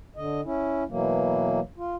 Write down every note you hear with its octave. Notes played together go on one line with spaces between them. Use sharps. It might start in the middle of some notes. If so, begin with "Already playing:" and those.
D3 D#5
C#4 E4
B2 E3 F#3 A#3
F4